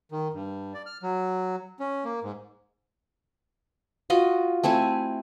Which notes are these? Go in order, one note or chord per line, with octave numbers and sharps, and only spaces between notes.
D#3
G2
D5
F6
F#3
C#4
A#3
G#2
F4 F#4 D#5 F#5
A3 C4 E4 G#5